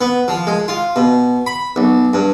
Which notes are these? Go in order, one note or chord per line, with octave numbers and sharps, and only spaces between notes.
B3
F3
G#3
F4
B2
B5
B1
G2